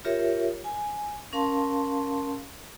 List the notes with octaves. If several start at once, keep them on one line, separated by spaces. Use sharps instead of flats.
F4 G4 A#4 C#5 E5
G#5
C#4 A#4 F5 A5 C6